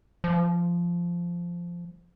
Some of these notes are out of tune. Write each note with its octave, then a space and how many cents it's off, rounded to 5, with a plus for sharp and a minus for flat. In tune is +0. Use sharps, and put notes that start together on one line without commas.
F3 -10